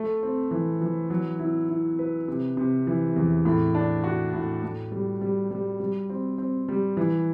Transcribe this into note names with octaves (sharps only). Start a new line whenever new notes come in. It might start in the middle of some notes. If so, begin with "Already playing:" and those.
Already playing: A3
C4
E3
E3
F#3
E4
E4
B4
C3
C3
E3
E2
A2
D4
F#4
A2
A2
G3
G3
G3
G3
C4
C4
G3
E3